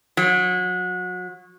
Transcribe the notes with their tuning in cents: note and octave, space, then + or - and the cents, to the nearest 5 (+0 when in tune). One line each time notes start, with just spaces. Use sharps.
F#3 -30